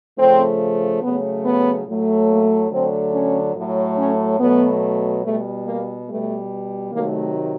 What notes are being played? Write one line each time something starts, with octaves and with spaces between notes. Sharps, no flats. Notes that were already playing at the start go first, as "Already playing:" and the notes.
C#3 F3 A3 C4
C#3 F#3 A3 B3
B3
A2 F#3 A3
A#3
D3 F#3 A3 C4
C#4
A2 F#3 A3
C#4
B2 F#3 A3 B3
B2 G3 A3
A#3
B2 G3 A3
C3 D#3 F#3 A3 A#3